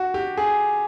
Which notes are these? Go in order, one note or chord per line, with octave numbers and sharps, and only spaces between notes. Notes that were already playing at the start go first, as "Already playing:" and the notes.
Already playing: F#4
G4
G#4